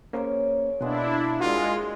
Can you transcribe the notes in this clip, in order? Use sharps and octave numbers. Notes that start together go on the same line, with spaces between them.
A#3 C#4 G#4 A#4 C5 C#5
B2 G#3 A#3 D4 E4 F#4
G3 G#3 F4 F#4 A#4